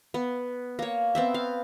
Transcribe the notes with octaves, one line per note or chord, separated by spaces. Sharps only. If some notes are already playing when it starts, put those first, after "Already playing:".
B3
A#3 C#5
B3 C4 E5
F5